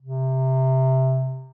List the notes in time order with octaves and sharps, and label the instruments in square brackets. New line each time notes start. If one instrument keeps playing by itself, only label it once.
[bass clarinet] C3